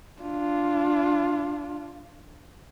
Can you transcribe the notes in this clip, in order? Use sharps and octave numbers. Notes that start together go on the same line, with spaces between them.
D4 F4